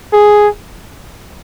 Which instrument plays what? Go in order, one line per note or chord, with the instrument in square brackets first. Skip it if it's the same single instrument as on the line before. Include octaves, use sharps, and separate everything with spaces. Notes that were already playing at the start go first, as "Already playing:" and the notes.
[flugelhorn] G#4